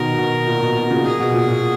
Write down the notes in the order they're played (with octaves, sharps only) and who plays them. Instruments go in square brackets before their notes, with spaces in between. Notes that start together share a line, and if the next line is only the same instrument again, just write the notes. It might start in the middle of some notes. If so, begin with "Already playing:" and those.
Already playing: [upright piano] B2 D#3 [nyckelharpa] A#4
[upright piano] B2
A#2
B2
B2
A#2 C#3
[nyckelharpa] G#4
[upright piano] B2
A#2
A#2